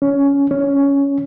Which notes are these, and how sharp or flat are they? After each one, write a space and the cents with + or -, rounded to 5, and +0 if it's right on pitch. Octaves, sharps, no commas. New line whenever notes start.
C#4 +15
C#4 +10